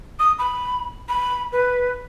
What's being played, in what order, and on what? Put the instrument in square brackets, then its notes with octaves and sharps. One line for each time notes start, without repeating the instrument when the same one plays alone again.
[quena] D#6
B5
B5
B4